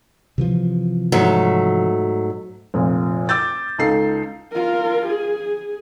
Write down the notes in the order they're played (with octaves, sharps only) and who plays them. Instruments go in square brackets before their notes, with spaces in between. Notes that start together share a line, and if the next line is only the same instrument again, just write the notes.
[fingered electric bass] C3 E3 F3
[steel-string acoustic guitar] G#2 F#3 A3
[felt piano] F1 A#2
D6 E6 G6 A6
C#2 D#4 A4 C7
[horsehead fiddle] F4 A#4
G#4